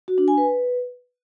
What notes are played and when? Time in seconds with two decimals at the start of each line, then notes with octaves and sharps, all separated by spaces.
0.08 F#4
0.18 D4
0.28 G#5
0.38 B4